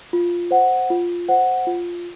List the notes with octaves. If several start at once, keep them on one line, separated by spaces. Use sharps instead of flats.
F4
C5 F#5
F4
C5 F#5
F4